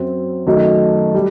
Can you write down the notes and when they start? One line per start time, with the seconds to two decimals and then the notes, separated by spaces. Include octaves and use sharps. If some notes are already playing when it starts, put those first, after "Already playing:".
Already playing: F#2 F#3 C4
0.47 F#2 D#3 F#3 A3 D#4
1.14 G3